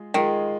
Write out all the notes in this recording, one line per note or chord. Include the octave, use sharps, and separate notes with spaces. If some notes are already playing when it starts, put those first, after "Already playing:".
Already playing: G#3 F4 G#4
D#3 G#3 F4 G#4